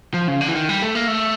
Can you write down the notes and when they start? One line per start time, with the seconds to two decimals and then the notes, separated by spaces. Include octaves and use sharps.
0.14 F3
0.28 C#3
0.41 D3
0.48 E3
0.55 D#3
0.69 G3
0.82 A3
0.95 A#3
1.08 A3